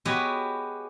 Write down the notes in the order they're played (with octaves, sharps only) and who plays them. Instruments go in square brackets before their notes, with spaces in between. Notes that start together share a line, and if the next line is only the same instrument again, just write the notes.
[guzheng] G#3 B3 F#4 G4 B4 C#5